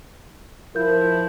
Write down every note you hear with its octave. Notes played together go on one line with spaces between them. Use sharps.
F3 E4 A#4 G6